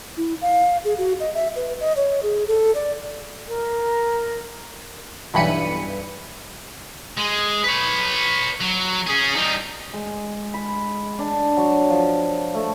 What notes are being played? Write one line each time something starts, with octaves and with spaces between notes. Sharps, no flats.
E4
F5
G#4
F#4
D#5
E5
B4
D#5
C#5
G#4
A4
D5
A#4
B1 G2 E3 B5 C#7 D#7
G#3
B4 C#5
F#3
C#4 G#4
G3 D#4
G#3
B5
D4
F#3
F3
A3